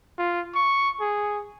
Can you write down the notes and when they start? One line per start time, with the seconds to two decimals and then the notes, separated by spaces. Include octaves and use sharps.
0.19 F4
0.55 C#6
1.00 G#4